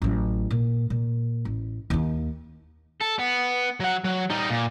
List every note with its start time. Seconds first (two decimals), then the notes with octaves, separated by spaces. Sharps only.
0.02 A1 F#3
0.51 A#2
0.90 A#2
1.45 A1
1.90 D#2 D#4
3.01 A4
3.20 B3
3.80 F#3 F#5
4.04 F#3
4.30 G3 D#4
4.50 A#2